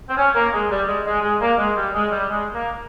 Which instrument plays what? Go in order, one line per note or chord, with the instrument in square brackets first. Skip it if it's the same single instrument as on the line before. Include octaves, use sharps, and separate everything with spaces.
[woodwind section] C4
C#4
A#3
G#3
G3
G#3
G#3
G#3
A#3
G#3
G3
G#3
G3
G#3
A#3